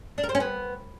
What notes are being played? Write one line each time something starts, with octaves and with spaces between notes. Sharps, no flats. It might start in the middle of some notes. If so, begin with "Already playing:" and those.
D4
A#4
C5
C#4
B3